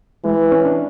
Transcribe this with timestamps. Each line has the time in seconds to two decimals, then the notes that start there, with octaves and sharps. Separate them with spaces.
0.24 E3 G#3
0.52 C#4
0.65 D4